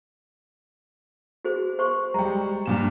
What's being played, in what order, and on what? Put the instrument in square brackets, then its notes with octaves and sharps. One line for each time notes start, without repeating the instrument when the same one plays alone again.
[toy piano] F#4 G#4 C5
C5 C6 C#6
[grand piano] G3 G#3 [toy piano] G5 A#5
[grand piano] G2 A#2 E7